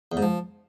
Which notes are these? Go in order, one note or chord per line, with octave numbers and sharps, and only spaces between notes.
E2
G#2
F3